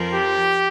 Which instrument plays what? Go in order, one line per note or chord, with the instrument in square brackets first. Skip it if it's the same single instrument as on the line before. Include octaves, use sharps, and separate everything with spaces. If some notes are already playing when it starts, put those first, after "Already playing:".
Already playing: [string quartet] F2 F3 C4 A#4
[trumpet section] G4